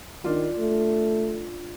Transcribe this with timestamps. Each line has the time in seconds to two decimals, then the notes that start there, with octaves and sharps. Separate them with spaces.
0.24 D#3 D4 F4
0.59 A3